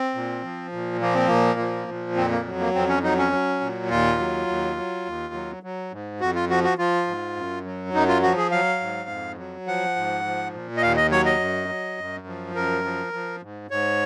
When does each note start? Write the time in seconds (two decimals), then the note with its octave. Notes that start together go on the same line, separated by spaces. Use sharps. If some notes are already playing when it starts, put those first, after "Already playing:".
Already playing: C4
0.15 A#2
0.44 F3
0.72 A#2
1.01 F3 A#3
1.15 C4
1.27 A#2 A#3
1.59 F3
1.88 A#2
2.16 F2 C4
2.31 A#3
2.46 F#3
2.60 A#3
2.74 F2 C4
2.89 C#4
3.03 F#3 D#4
3.18 C#4
3.32 F#3
3.61 A#2
3.90 D#2 F4
4.19 F#3
4.47 D#2
4.76 F#3
5.05 D#2
5.34 F#3
5.63 F#3
5.92 G#2
6.21 F2 F#4
6.35 F4
6.49 F3 F#4
6.64 F#4
6.78 F3 F4
7.07 G#2
7.36 F#2
7.65 F#3
7.94 F#2 D#4
8.08 F4
8.22 F3 F#4
8.37 G#4
8.51 F#3 F5
8.80 G#2
9.09 F2
9.38 F#3
9.67 F3 F#5
9.96 G#2
10.24 F3
10.54 A#2
10.77 D#5
10.82 D#2 F5
10.97 D#5
11.11 F#3 C#5
11.25 D#5
11.40 F#2
11.68 F#3
11.98 F#2
12.27 F3
12.55 F#2 A#4
12.84 F3
13.13 F3
13.42 G#2
13.71 G#2 C#5